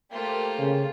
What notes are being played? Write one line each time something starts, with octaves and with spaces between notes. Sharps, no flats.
A3 A#3 F4 G4 C5
C#3